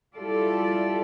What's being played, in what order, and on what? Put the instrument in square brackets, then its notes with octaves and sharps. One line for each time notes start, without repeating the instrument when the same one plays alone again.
[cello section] G3 E4 F4 G4 A4 D5